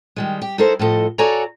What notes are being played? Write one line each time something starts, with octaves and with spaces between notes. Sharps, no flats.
D#3 G3 G#3
G4
D#4 E4 A4 A#4 C5
A2 F3 A4 D#5
F#4 A4 C#5 D5 G#5 A#5